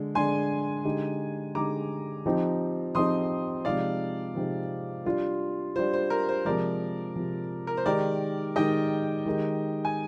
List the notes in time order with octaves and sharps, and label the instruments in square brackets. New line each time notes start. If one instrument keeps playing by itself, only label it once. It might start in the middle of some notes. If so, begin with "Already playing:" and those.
Already playing: [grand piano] D3 G#3 D4
[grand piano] D3 G#3 D4 [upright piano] G#5 C6
[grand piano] D3 G#3 D#4 G4
[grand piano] D3 G#3 D#4 G4 [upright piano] A#5 D6
[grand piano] F3 C4 D#4 G4
[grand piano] F3 C4 D#4 G4 [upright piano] C6 D#6
[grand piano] C3 F3 G#3 C4 D#4 [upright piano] D5 F5
[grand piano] C3 F3 G#3 C4 D#4
G3 D4 F4
[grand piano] G3 D4 F4 [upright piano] C5
[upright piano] C5
A#4
C5
[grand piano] C3 F3 G#3 [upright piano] A#4 D5
[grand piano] C3 F3 G#3
[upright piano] A#4
C5
[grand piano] D#3 G#3 D#4 G4 [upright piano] A#4 D5
[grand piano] D#3 G#3 D#4 G4 [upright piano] D#5 G5
[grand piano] D#3 G#3 D#4 G4
[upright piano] G#5